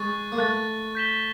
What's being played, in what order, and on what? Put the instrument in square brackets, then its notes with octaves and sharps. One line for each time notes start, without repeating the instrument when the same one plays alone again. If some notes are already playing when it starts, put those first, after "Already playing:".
Already playing: [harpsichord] G#3 [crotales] C#6 F#6 A6
[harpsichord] A#3
[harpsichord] A3 [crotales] C#6 F#6 A6
[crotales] G6 B6 E7 G7